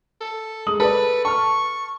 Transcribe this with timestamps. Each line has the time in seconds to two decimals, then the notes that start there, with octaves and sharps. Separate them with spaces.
0.21 A4
0.67 G#3 D#6 F#7
0.80 A4 B4 D5
1.25 A5 C#6 F6